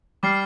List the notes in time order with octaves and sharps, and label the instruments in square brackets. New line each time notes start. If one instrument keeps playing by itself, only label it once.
[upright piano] G3 [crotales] D6 F6 A6 C7